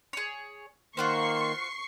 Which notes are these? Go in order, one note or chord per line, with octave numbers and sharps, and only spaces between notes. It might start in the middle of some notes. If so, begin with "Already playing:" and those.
G#4 C#5
D#3 A#3 F4 F#4 C5 C6 C#6 C7